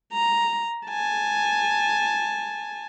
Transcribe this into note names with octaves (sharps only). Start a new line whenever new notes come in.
A#5
G#5 A5